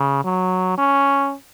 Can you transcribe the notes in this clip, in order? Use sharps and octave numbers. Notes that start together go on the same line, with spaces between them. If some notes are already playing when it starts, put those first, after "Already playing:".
Already playing: C#3
F#3
C#4